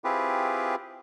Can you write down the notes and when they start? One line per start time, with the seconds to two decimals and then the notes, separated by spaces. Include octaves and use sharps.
0.04 C4 E4 F4 G4 G#4 B4